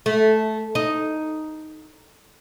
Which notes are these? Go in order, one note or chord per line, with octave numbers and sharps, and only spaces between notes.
A3
D#4